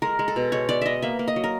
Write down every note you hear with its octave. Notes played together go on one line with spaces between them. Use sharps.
G#3 A#4
G#3
A4
B2
G#3 C#5
B3 D5
B3 D#5 E5
A#3 E5
A#3
D#5
F#3
A#4